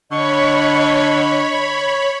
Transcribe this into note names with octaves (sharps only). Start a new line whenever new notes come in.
D3 C#5 D#5 B5 C#6